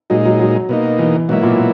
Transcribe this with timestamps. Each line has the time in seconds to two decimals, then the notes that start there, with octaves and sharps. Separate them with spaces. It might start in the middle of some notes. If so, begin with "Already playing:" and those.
0.10 A#2 F#3 G#3 D#4
0.25 F#3
0.39 F#3
0.69 B2 A#3 D#4
0.99 E3
1.29 G#2 B2 F#3 A#3 E4
1.43 A#2
1.58 A#2